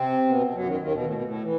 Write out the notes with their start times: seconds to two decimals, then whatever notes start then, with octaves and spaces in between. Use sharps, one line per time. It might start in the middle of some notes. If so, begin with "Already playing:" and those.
Already playing: C3 C4
0.29 B2 B3
0.54 F#2 F#3
0.66 D#2 D#3
0.79 D#2 D#3
0.92 B2
1.04 A2
1.14 B2
1.23 A2
1.42 E3